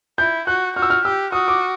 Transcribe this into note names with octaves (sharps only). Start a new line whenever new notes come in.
E4 G6
F#4 F#6
F#4 F6
E6
F6
G4 E6
F#4 D#6
D6